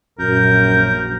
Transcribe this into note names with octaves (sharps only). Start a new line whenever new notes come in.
A#1 F#2 A#4 G6